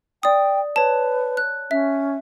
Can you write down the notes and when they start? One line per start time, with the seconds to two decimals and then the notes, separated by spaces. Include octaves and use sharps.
0.23 D5 G5 D#6
0.76 B4 C#5 A5
1.37 F#6
1.71 C#4 E5